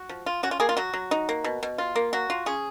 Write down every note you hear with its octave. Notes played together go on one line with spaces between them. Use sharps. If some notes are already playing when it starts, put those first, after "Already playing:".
Already playing: F#4
F3
F4
C#4 F#4
F4
A#3 G#4
F4
F#3 F#4
F#3
D#4
A#3
B2
B2
F4
A#3
F#3 F#4
F4
C#4 G#4